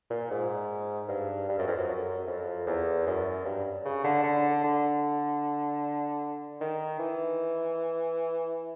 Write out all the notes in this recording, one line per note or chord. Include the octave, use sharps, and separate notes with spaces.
A#2
G#2
G2
G2
F#2
F2
F#2
F#2
F2
E2
F#2
G2
C#3
D3
D3
D3
D#3
E3